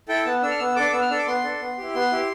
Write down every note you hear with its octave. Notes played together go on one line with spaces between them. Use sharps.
E4 A4 G5
B3 A5
D4 A4 E6
F6
B3 E6
D4 A4 D6
B3 E6
F6
D4 A4 E6
D6
B3 C6
D4 A4
B3
E4 G4
B3 C6
E4 G4